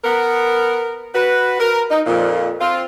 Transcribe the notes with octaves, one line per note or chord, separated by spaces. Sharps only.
B3 A#4
F#4 B4
A#4
D#4
F2 A#2
C4 F4